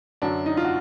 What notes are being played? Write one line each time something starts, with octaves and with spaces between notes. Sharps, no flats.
F#2 D3 F#3 D4
D#4
F4
F#4